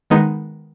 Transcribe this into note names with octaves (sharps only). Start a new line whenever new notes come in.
D#3 G#3 B3 D#4